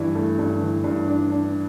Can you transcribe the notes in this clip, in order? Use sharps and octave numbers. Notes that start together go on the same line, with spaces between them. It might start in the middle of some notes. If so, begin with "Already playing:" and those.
Already playing: G2 E3
A3
G2
E3
G2
D4
D4